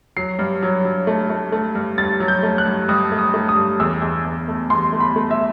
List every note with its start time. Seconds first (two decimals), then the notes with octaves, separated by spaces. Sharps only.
0.16 F#3 C7
0.39 G2
0.62 F#3
0.85 F#3
1.07 A3
1.30 A3
1.52 A3
1.75 G2
1.98 G2 A6
2.20 F#3
2.28 G6
2.43 A3
2.58 F#6
2.65 G2
2.89 G2 D#6
3.12 A3
3.19 D#6
3.34 A3
3.49 D#6
3.56 G2
3.80 E2 E6
4.02 E2
4.25 E2
4.48 A3
4.70 E2 C6
4.93 A3
5.00 B5
5.16 A3
5.31 E5